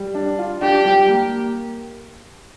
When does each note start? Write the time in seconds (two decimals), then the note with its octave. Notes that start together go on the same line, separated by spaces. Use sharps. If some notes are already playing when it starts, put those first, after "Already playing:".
Already playing: G3
0.14 D4
0.38 F4
0.61 D4 G4
0.85 G3
1.08 A#3